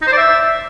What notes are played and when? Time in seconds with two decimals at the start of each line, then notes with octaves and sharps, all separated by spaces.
0.02 D#4
0.07 C5
0.12 D5
0.18 E5